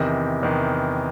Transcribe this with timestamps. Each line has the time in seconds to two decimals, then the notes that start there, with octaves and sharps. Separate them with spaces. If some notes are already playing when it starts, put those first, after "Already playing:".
Already playing: E2 C3 D#3
0.43 E2 C3 D#3